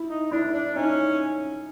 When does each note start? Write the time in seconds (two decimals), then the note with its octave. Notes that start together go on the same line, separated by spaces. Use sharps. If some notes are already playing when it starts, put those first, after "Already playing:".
Already playing: E4
0.09 D#4
0.31 D4 E4
0.53 D4
0.75 C#4 D#4